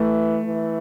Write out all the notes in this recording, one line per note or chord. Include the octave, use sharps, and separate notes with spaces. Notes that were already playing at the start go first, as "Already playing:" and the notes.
Already playing: E3 A3
E3